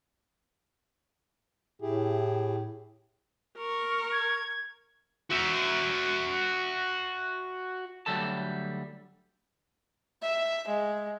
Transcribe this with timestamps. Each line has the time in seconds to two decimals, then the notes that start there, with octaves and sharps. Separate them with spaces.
1.82 A2 E4 G4 G#4
3.57 A#4 C#6
4.12 G#6
5.30 F#4 E5
8.06 D2 G2 F#3 G3 A4 A5
10.22 E5
10.68 G#3